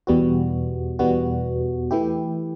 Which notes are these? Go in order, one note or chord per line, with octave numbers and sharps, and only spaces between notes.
E2 B2 G3 B3 F#4
E2 B2 G3 B3 F#4
E3 A3 E4 G4